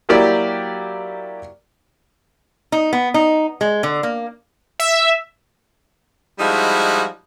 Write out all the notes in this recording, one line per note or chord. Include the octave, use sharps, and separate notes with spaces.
F#3 A#3 E4 G4 D5
D#4
B3
D#4
G#3
D3
A#3
E5
F3 G3 G#3 D#4 E4 F#4